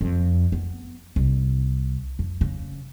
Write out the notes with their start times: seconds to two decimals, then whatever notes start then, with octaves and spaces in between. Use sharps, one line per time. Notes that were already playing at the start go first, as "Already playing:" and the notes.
0.01 F2
0.52 B3
1.16 C2
2.19 F2
2.41 C#3